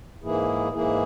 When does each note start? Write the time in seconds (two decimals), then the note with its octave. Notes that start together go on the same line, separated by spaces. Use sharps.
0.21 G#2 E3 A#3 E4 G#4
0.72 G#2 E3 A#3 E4 G#4